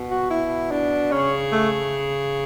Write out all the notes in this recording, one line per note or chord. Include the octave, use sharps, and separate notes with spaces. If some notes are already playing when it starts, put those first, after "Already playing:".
Already playing: B2
F#4
E4
D4
C#3 C#4
A3